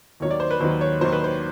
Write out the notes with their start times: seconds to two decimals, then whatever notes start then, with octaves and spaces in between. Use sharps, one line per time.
0.20 D#2 D#3 F#3 C#5
0.31 D5
0.40 C5
0.51 B4
0.60 D#2 D#3 F#3 C5
0.81 C#5
1.01 D#2 D#3 F#3 C5
1.13 B4
1.24 C5